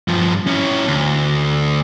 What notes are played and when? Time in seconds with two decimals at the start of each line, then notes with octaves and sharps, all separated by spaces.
0.08 G2 F3
0.47 C#4 E4
0.88 D2